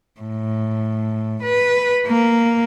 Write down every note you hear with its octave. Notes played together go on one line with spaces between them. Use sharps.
A2
B4
A#3